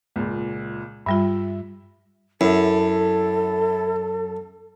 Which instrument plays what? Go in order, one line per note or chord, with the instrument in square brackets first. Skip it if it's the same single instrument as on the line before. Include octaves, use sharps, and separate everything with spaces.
[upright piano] C#2 A#2
[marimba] G2 G3 F4 [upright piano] E5
[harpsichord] F#2 [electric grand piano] E4 [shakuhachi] A4